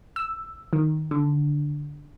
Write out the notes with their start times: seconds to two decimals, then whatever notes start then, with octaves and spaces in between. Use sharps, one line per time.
0.16 E6
0.73 D#3
1.11 D3